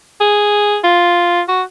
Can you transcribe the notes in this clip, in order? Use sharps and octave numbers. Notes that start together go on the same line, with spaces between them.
G#4
F4
F#4